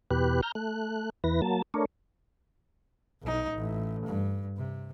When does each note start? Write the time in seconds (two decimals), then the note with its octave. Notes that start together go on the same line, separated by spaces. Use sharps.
0.11 E2 B2 G4 B4 F#6
0.43 A#5 F6 G6
0.55 A3 F#6
1.24 E2 E3 B4 A#6
1.42 F#3 A#3 A5
1.74 A3 D4 A#4 C#5
3.22 B1 D#4
3.53 A1
4.06 G2
4.57 C3